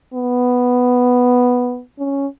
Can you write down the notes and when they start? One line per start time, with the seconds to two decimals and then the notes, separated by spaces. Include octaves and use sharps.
0.14 B3
1.99 C#4